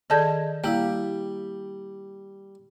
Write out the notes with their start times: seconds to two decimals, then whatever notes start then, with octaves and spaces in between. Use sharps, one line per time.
0.10 D#3 G#4 A4 D5 D#5 A5 G6 G#6
0.64 G3 A#3 E4 G4 F5